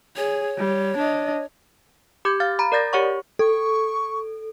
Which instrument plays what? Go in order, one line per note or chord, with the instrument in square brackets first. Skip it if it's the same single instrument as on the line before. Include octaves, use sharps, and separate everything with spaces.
[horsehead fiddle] G#4 [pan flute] C#5
[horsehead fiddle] G3
D4 D#5
[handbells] G4 D6 G6 G#6
F5 F6 A6
A#5 B5
A#4 D5 G6 A6 A#6
G4 C#5 F#5 C#6
[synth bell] A4 [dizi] C#6